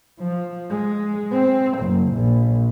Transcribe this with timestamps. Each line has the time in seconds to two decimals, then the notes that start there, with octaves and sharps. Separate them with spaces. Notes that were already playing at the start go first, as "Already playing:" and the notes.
0.19 F3
0.70 G#3
1.32 C4
1.79 F#1
2.12 A#1